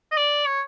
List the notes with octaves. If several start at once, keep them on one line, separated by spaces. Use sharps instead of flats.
D#5
D5
C#5